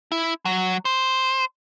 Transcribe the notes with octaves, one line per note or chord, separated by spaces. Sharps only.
E4
F#3
C5